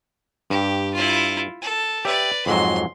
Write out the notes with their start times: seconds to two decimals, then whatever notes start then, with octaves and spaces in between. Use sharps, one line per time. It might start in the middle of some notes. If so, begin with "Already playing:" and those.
0.50 G2 G4
0.94 E4 F4
1.61 A4
2.05 G4 B4 D5 E5
2.46 F2 G#2 F#3 C6